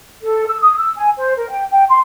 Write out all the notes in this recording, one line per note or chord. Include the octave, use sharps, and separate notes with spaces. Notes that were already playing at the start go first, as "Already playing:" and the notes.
A4
E6
D#6
E6
G#5
C5
A#4
G5
G5
C6